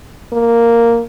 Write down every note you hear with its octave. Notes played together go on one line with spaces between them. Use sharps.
A#3